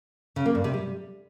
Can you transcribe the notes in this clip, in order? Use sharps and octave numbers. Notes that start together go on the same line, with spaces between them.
C#3
A#3
G2
C3
G3